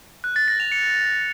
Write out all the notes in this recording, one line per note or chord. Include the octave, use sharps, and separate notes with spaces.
F#6
A6
A#6
F7
C#7